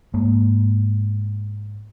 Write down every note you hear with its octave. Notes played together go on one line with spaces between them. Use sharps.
G#2 A#3